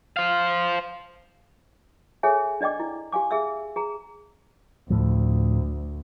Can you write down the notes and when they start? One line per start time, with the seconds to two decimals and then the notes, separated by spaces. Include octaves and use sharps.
0.17 C5 F5
2.23 G#4 A4 C#5 E5 G#5
2.61 D4 D5 D#5 G5 D6
2.80 E4
3.12 G4 F5 G#5 D6
3.31 G#4 E5 E6
3.76 G#4 A#5
4.90 D2 A2 F3